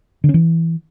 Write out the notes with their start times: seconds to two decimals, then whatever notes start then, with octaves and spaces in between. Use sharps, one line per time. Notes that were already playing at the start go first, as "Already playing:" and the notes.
0.24 D3
0.29 C#4
0.34 E3